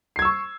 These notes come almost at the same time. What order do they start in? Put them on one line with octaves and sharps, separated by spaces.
C7 G#6 E6 C#6